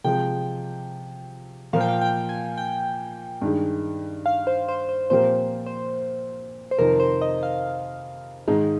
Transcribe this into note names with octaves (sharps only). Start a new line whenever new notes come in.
C3 F3 G#3 G5
A#2 F3 A#3 F5
G5
F5
G5
G#5
G5
G2 D#3 G#3
F5
C5
C5
C5
A#2 F3 C4 G4 A#4 C5
C5
C5
F2 C3 D#3 A#4
C5
D#5
F5
G#2 D#3 G#3 D#4